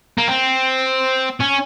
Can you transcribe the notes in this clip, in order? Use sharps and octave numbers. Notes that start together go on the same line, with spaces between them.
A#3
C4
C#4